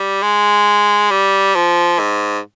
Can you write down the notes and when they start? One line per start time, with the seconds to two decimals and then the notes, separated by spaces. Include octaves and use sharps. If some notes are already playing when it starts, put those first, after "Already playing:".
Already playing: G3
0.23 G#3
1.11 G3
1.55 F3
1.99 G#2